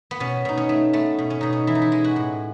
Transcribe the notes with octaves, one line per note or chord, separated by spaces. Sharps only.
B3
B2 C#4
B2 D#4
C#4
A3
A3 B3
B2
C#4
B2 D#4
C#4
E3 E4
D#4
E4
G#3
F#4
A2